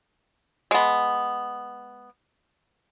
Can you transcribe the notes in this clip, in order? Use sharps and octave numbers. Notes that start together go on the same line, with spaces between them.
G#3 B3